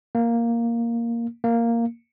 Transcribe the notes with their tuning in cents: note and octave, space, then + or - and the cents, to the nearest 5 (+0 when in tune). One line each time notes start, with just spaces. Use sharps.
A#3 +0
A#3 -5